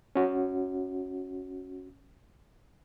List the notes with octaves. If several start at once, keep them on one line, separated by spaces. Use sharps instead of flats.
C#4 F#4